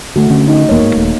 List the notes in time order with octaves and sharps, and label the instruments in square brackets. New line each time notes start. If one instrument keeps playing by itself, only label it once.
[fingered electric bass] D3 [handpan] A3 F#4
[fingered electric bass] D3 C#4
[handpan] D#4
[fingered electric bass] E1 E2 [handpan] A#3 C#5
[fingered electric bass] G#2
D#1 A3